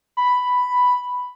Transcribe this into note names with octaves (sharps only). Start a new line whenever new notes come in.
B5